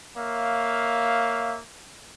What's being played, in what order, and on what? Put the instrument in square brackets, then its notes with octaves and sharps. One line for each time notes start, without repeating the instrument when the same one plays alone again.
[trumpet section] A#3 C#5 E5 F5